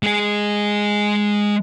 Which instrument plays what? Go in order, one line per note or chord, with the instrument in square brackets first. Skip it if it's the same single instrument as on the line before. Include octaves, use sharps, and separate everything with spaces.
[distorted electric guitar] G#3 G#4